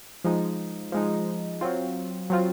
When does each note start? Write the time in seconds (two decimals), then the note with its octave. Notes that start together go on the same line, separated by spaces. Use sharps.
0.24 F3 G#3 D#4
0.92 F3 G#3 D#4
1.61 F#3 C4 F4
2.30 F#3 C4 F4